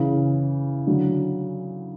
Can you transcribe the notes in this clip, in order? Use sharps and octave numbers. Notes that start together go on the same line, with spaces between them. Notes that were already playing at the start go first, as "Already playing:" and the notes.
Already playing: C#3 E3
D3 F#3